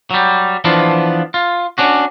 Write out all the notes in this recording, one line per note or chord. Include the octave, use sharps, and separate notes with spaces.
F#3 G3
E3 F3 B3 D4 F4
F4
C#4 D4 F#4